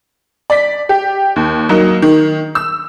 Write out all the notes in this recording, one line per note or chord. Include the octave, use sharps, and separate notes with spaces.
D5 B6
G4
D#2
F#3 A#3 D#4
D#3
E6